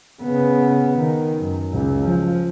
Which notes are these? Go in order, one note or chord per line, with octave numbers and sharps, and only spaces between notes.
C#3 B3
D#3
F#2
C#2
F3